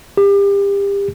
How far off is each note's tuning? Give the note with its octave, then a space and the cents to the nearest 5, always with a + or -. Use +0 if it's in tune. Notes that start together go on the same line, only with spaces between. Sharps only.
G4 +30